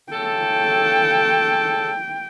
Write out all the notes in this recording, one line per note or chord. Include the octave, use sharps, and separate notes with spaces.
C#3 A4 G5